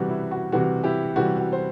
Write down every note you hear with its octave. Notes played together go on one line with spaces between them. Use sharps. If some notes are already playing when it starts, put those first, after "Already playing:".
Already playing: C3 E3 G3 F#4
E4
F#4
C3 E3 G3 F#4
E4 G4
C3 E3 G3 F#4
F#4
C5